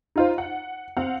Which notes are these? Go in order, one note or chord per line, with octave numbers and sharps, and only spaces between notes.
D#4 F4 C5
F#5
C4 F5 F#5